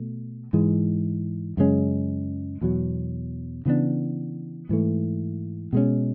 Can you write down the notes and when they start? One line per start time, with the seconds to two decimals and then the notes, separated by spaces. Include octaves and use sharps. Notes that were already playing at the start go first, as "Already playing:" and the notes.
Already playing: B2 A3
0.53 G#2 E3 G#3
1.57 F#2 C#3 G#3 C#4
2.61 E2 B2 F#3
3.65 C#3 E3 B3 D4
4.69 G#2 E3 A3
5.73 B2 G#3 C#4